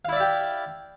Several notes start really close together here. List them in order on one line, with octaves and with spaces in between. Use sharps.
F5 E4 D5 E5 G4